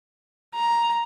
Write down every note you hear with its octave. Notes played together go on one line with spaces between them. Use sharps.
A#5